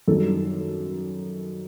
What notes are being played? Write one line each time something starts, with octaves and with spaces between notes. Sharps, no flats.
F#2 D#3 G3 A4